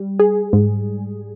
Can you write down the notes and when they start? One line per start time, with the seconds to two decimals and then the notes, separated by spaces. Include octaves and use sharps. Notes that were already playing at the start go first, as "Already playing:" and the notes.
Already playing: G3
0.19 G#4
0.53 G#2